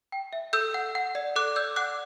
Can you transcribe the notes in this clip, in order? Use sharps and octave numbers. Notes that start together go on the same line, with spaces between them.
G5
E5
A4 E6 G6
F#5
F#5
D5
A4 D6 F#6
D5 E6 G6
F#5 D6 F#6